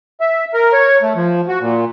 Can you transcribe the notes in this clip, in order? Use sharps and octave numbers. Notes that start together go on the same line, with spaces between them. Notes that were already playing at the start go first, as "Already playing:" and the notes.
E5
A#4
C#5
A3
F3
F#4
A#2